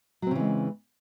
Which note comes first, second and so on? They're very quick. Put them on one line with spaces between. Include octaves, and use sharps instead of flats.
F#3 C4 C#3 E3 G#3